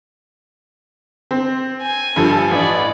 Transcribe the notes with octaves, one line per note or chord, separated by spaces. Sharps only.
C4
G#5
G2 F3 A4
A1 D5 B5